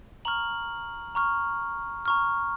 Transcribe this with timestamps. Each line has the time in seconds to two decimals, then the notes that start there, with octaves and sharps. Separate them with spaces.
0.25 A#5 C#6 F6 F#7
1.15 A#5 C#6 F6
2.06 A#5 C#6 F6